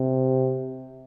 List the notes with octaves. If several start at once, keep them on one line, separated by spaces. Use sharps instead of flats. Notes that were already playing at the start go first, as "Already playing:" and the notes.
Already playing: C3